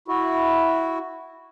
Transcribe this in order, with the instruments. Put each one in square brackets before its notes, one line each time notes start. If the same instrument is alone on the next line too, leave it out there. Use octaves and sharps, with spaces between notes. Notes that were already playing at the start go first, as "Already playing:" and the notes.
[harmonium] E4 F#4